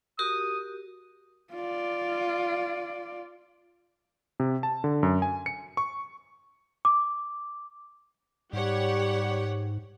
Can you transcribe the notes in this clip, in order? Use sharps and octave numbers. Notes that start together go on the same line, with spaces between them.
F#4 G4 A#4 D#6
F4 D5
C3
A5
D3
F#2
G#5
C#7
C#6
D6
G#2 G3 G4 C#5 F#5